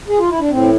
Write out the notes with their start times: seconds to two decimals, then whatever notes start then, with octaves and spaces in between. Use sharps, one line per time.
0.08 G#4
0.19 F4
0.29 E4
0.40 D4
0.50 A2 E3 C4